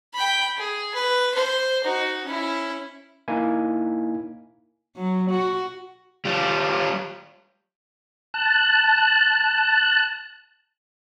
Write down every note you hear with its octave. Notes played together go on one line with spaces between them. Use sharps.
G5 B5
G#4
B4
C5
D#4 F#4
C#4 E4
A#3 D#4 E4 G#5
F#3
F#4
G3 F4
A5 F#6